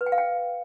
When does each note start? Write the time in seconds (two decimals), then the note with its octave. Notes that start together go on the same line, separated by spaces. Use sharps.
0.01 B4
0.06 G5
0.12 F5
0.18 G5